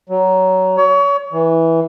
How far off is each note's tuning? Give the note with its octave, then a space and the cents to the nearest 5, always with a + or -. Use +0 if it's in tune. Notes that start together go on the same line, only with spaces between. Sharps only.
F#3 +20
C#5 +30
E3 -10